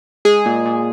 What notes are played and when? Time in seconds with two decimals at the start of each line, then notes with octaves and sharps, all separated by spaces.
0.25 G#3 G#4
0.46 A#2
0.66 A#2